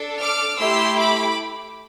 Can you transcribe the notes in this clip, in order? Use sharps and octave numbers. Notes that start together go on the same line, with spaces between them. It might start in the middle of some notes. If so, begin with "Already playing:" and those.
Already playing: D4 A4
D6 F6
A3 E4 G4 C6 E6
B5 D6